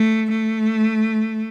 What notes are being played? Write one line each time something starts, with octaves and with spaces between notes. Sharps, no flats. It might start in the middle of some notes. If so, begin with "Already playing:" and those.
Already playing: A3
A3